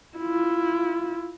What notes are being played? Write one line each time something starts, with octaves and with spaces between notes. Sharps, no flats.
E4 F4